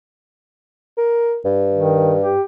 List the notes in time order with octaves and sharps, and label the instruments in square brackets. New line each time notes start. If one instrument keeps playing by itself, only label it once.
[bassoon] A#4
G2
[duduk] D#3
G4